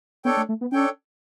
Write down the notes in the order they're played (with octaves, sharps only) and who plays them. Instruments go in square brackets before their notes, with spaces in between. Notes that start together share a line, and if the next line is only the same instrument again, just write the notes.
[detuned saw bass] B3 [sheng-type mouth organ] D4 A4 C#5 G5
[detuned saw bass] A3
A3
B3
[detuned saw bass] C#4 [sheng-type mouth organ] D4 A4 C#5 G5